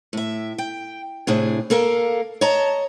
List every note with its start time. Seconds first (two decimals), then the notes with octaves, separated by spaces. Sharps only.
0.13 A2 E5
0.58 G5
1.27 A2 C3 D4 G#4
1.70 A#3 A4 A#4 F5
2.41 C#5 D#5 A5 A#5